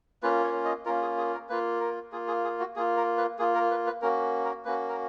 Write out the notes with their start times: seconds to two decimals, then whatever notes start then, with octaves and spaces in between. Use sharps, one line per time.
0.23 A#3 C#4 F4 B4
0.44 C#5
0.65 D#5
0.85 A#3 C#4 F4 A#4
1.02 G#4
1.18 G#4
1.34 A#4
1.49 A#3 F4 B4
1.80 A#4
2.12 A#3 F4 G#4
2.28 G#4
2.44 G#4
2.60 F#4
2.76 A#3 F4 G#4
2.97 A#4
3.17 B4
3.39 A#3 F4 G#4
3.54 A#4
3.71 B4
3.87 B4
4.02 A#3 C#4 F#4 A#4
4.44 A#4
4.65 A#3 C#4 F#4 B4
4.89 A#4